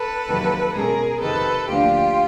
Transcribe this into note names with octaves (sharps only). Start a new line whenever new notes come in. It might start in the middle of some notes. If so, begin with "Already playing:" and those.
Already playing: A4 B4
F2 C3 D#3 F#3 A#3
B2 G#3 C#4 G#4 A#4
F2 C3 D#3 A4 B4
D2 D3 F3 A#3 D4 F4 G4